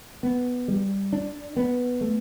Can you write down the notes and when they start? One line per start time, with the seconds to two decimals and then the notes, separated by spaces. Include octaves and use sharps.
0.23 B3
0.68 G3
1.13 D4
1.56 B3
2.01 A3